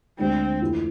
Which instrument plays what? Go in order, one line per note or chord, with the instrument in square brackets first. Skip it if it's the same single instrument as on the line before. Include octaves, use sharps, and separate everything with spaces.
[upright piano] D2 D3 G#3 D4 [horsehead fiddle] C4
[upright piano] F2 E3 A3 E4